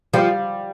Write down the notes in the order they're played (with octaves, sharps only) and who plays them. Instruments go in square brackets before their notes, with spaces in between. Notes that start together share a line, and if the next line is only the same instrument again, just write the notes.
[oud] F3 [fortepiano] G3